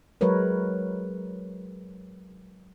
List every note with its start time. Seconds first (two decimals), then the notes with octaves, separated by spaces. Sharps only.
0.21 F#3 G#3 A#4 B4 C#5